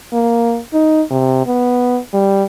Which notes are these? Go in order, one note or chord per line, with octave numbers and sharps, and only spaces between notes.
A#3
D#4
C3
B3
G3